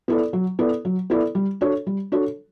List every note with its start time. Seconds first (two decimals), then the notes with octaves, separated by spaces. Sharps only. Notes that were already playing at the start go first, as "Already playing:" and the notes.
0.08 B3 E4 A4 D5
0.33 F#3
0.59 B3 E4 A4 D5
0.85 F#3
1.10 B3 E4 A4 D5
1.35 G3
1.61 D4 F#4 A4 C#5
1.87 G3
2.12 D4 F#4 A4 C#5